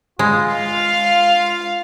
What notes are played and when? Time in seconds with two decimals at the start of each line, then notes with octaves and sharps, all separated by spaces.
0.19 G#3 F4
0.53 F5